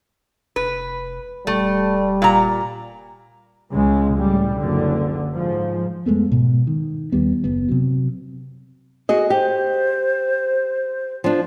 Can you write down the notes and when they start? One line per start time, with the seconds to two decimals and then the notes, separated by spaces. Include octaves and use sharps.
0.56 F1 B4
1.47 D#1 G3 A3
2.22 A#2 A#5
3.71 C#2 C#3 G#3
4.16 A2 G3
4.57 F#1 D3
5.35 G#2 F3
6.06 F2 G#3 A3 B3
6.32 G#2 B2
6.67 D#3
7.12 D#2 G3 B3
7.44 F#1 B3
7.69 C3 F#3
9.09 F#4 G#4 D#5
9.30 G4 C5
11.24 F3 D4